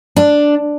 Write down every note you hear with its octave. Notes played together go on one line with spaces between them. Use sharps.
D4